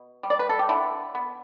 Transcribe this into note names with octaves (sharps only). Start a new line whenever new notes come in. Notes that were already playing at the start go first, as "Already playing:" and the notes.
Already playing: B2
G3
D5
B4
A4
G4
D3 E4
B3